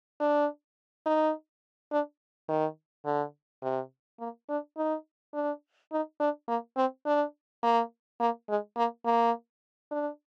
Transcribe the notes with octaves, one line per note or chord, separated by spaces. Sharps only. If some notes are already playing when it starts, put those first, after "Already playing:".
D4
D#4
D4
D#3
D3
C3
A#3
D4
D#4
D4
D#4
D4
A#3
C4
D4
A#3
A#3
G#3
A#3
A#3
D4